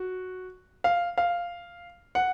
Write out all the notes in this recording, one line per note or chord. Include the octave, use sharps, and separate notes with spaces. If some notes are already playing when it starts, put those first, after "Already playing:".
Already playing: F#4
F5
F5
F#5